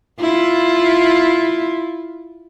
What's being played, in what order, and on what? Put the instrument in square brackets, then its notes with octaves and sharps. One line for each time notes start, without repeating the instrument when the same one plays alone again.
[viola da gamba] E4 F4